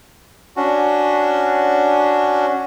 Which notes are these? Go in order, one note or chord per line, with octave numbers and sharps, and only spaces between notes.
C#4 D4 F#4